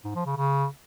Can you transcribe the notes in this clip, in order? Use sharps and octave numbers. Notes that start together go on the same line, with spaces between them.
G#2
F3
C#3
C#3